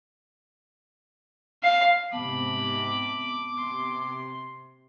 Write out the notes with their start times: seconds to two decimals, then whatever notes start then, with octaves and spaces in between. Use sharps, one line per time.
1.63 F5
2.13 G#2 C3 B3 A5 B5 D6
3.58 C3 C6